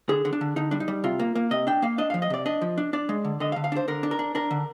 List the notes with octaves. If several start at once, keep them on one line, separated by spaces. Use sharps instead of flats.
D3 G#4
D3
D4
D3
D3 D#4
G3 D4
D#4
G3
C3 F4
A#3
A#3
C3 D#5
D4 G5
A#3 F5
D4 D#5
F3 F5
D#5
C3 D5
D4 D#5
F3
D4
D4 D5
G#3
D3
D3 D#5
F5
D3
F5
D4 C5
D3 A#4
D4
A#4
D4
D4 A#4
D3